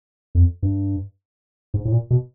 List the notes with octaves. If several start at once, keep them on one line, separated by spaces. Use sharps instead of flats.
F2
G2
G#2
A2
A#2
B2